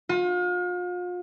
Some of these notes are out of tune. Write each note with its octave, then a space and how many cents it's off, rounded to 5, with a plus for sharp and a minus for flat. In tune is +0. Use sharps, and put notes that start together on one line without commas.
F4 +40